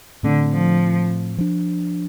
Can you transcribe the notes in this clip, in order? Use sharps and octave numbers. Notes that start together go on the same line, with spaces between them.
A2 D3 A3 C4
F3
F3 D4